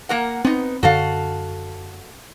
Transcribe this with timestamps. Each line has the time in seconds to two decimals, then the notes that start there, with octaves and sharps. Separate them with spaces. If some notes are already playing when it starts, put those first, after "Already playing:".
0.09 A#3 A#4 F#5
0.45 B3 C4 D#4
0.83 F#2 D3 F#4 A4 F5